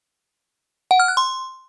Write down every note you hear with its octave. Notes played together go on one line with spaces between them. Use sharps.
F#5
F6
F#6
C6